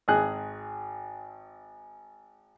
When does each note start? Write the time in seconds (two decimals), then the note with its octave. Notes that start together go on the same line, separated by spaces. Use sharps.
0.08 G#1 G#4 F#6